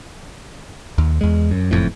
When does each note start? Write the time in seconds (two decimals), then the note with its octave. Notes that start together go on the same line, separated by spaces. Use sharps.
0.98 D#2
1.21 E2 G#3
1.51 F#2
1.71 F#1 F2 A2